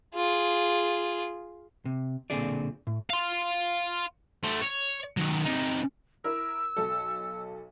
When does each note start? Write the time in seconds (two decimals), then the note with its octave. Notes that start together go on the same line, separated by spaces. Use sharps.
0.15 F4 G#4
1.85 C3
2.30 B1 A#2 D3 C4 G#4 D5
2.87 A2
3.10 F5 C6
4.44 A3 C5
4.62 C#5
5.17 D#3 F#3
5.46 C3 D#4
6.24 E4 A#4 E6
6.77 B1 A4